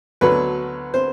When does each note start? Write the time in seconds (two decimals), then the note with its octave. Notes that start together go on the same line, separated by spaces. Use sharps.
0.21 D2 D3 F#3 B3 B4
0.94 C5